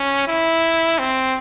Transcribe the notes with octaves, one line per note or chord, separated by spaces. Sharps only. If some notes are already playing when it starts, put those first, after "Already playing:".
Already playing: C#4
E4
C4